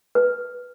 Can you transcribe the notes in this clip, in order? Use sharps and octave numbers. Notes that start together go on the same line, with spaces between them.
B4